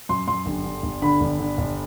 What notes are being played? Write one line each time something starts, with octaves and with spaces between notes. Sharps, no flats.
F#2 C6
F#2 C6
G1
D3
G1
D3 B5
G1
D3
G1